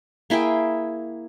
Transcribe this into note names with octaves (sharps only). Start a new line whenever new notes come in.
A#3 E4 G#4 G5